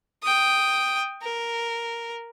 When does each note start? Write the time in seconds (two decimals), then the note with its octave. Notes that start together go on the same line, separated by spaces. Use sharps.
0.23 G5 D#6
1.22 A#4